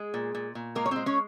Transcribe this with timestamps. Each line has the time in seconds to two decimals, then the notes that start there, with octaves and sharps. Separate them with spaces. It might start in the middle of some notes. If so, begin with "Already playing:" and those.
Already playing: G#3 G#4
0.14 A#2
0.35 A#2
0.55 A#2
0.75 G#3 A#3 A#4
0.86 C#5
0.91 G#3 C4 C5
1.06 C#4 C#5